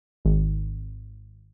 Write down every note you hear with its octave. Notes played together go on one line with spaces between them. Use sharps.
G#1